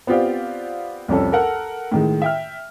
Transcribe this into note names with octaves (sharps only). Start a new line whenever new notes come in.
B3 C4 F4 G4 D5
C2 F2 C#4 A4
A4 A#4 F#5
A2 D#3 G#3
E5 G5 F6